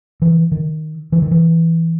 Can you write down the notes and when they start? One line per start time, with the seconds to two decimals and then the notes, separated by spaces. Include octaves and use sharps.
0.22 E3
0.52 D#3
1.12 E3
1.22 D#3
1.31 E3